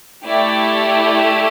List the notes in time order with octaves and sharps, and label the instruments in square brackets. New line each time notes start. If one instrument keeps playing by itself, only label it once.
[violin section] A3 E4 G4 D5